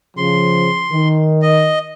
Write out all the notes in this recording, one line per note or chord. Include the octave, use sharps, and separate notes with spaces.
C#3 F3 C6
D#3
D#5